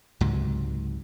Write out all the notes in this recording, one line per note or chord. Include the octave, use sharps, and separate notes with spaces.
C#2 G#2 C3 F#3